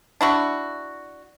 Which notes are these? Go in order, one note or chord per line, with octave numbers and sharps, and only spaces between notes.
D4 E4 F#4